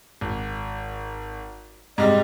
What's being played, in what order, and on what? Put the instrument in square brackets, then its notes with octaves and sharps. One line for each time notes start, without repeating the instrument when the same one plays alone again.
[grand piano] G#1
[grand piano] G#2 C3 G3 [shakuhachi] D#5